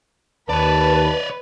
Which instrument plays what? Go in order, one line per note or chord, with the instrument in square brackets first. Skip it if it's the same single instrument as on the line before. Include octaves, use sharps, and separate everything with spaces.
[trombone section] D#2 [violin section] B4 [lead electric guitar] C#5 D5 [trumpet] A5